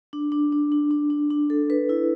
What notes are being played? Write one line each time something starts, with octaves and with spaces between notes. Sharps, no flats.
D4
D4
D4
D4
D4
D4
D4
A4
B4
E4